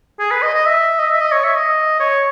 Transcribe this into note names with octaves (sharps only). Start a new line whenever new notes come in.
G#4
B4
D#5
D#5
E5
D#5
E5
D#5
C#5
E5
D#5
C#5